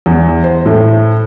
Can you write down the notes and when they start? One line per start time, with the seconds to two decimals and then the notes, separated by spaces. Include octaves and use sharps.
0.06 E2
0.44 C5
0.66 A2